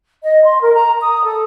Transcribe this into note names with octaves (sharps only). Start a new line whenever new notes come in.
D#5
C6
A#4
A#5
D#6
A4